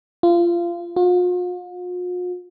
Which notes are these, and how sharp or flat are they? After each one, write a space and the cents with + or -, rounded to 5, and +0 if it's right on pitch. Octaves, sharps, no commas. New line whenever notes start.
F4 -25
F4 +45